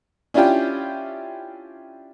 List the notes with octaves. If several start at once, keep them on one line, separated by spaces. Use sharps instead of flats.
C#4 D4 E4 F4 G4 G5